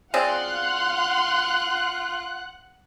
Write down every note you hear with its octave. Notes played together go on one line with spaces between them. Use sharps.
C4 F4 G#4 D5 F5 F#5 C6 F#6